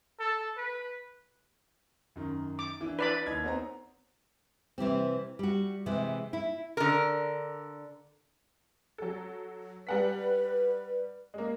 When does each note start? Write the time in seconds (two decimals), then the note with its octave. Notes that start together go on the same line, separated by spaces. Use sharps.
0.19 A4
0.57 B4
2.16 F#2 D#3
2.59 D6
2.81 E3 D4
2.99 B4 D5 B5
3.26 D#2 D#4 G#6
3.44 B3 C4 A#5
4.78 C3 E3 G3 C4
5.39 G3 F#4
5.86 C3 E3 G#3
6.33 E4
6.77 D3 A#4
8.98 F#3 A4
9.87 G3 B4 F#5 B6
11.34 G#3 A#3